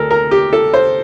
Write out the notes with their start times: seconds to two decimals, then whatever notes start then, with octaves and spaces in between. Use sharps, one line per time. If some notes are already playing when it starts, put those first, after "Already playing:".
Already playing: D2 A4 A#4
0.11 A#4
0.31 G4
0.53 A4
0.73 C5